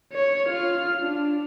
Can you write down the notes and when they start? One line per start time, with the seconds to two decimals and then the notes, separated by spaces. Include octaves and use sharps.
0.12 C#5
0.48 F4 F6
1.01 D4